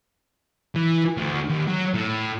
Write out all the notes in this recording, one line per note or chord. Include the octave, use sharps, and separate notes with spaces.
E3
D2
D#2
F#3
A2